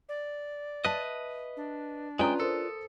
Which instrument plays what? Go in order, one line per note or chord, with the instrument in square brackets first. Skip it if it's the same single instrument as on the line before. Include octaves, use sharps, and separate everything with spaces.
[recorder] D5
[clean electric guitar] B4 D#5 [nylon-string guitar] E5 A5
[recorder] D4
[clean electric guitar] G#3 G5 [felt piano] C#4 A#5 D#6 [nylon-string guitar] F4 B4 D5
[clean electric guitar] A4 [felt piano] A#4 C5